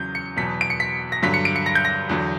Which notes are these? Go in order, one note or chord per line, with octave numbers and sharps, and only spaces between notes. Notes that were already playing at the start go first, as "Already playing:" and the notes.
Already playing: E2 C#3 F#3 G6
C#7
E2 B2 F#3 B6
D7
C#7
B6
A#6
G2 D3 F#3 B6
C#7
D7
C#7
A#6
G6
A#6
E2 D3 F#3